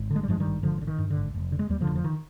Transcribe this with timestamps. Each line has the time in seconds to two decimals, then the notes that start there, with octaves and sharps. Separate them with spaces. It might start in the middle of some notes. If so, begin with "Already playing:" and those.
Already playing: G#1
0.11 D3
0.16 G#3
0.23 G3
0.28 G2 F3 G#3
0.40 D#3 G3
0.46 G#1
0.63 G#1 D3 F3
0.78 F3
0.81 D3
0.87 D#3
0.98 G2
1.10 D3
1.17 G#1
1.35 F1
1.52 D3
1.59 G#3
1.69 D#2 G3
1.81 D3 F3
1.87 F1
1.96 F3
2.04 D#3